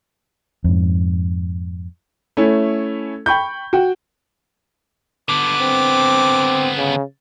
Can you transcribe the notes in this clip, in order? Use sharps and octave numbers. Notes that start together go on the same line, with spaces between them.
F2 G#2
A3 C#4 E4
G5 B5 C#6 G6
F#4 G5
D3 B3 D6
C4
C#3